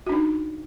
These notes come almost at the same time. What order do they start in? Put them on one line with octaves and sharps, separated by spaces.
F#4 D4 D#4